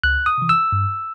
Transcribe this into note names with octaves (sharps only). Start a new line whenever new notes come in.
C#2 F#6
D#6
C3 E3
E6
G2